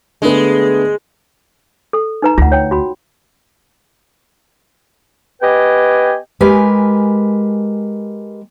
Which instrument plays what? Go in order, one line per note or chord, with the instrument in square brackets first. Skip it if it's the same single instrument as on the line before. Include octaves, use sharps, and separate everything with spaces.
[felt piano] D3 A3 B3 [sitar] G#3
[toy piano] A4
D#4 B4 A#5
[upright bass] D2 [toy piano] F4 F#5
[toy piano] C#5 G5
F#4 B5
[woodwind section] B3 G4 B4 D#5 G5 G#5
[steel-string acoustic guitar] G#3 G4 A#4 B4 G#5